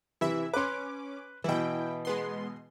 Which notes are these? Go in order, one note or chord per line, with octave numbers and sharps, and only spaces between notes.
C3 E3 E4 E5
C#4 B4 C6 D6
B2 E3 E4 G5
G#3 B3 C6